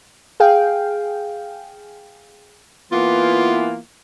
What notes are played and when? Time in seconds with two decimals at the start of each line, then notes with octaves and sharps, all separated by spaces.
0.40 G#4 F5 G5
2.92 E3 A#3 B3 F4